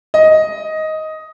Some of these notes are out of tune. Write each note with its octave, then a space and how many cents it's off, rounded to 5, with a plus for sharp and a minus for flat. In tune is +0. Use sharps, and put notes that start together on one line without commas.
D#5 +10